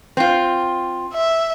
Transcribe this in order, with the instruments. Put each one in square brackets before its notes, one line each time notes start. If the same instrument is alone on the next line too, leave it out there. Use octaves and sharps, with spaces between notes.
[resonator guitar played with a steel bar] C4 F4
[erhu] E5